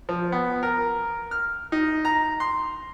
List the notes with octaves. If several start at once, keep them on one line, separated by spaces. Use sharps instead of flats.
F3
B3
A#4
F6
D#4
A#5
C6